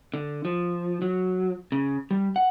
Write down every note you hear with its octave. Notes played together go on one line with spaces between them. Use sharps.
D3
F3
F#3
C#3
G3
F#5